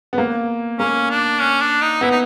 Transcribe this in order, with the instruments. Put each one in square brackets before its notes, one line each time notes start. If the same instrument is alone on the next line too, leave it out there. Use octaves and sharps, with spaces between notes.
[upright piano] B3
A#3
[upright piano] A#3 [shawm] C#4
[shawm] D4
C#4
D4
D#4
[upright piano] B3 [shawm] E4
[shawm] D#4